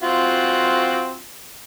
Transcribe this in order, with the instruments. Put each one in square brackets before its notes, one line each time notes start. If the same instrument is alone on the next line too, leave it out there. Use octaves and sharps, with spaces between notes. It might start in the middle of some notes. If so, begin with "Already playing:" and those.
[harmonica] C4 F4 F#4